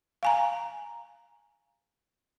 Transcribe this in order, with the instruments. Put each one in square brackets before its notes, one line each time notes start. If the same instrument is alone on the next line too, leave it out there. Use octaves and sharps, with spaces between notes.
[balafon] F5 G#5 A#5